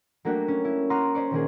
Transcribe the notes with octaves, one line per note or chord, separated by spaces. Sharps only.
F#3 A3 A#3 D4 F#4 G4
C#4
E4
F#5 A#5 C6 D6 D#6 F6
C#4 C5 D5 C#6
A#1 D#3 A#3 G#4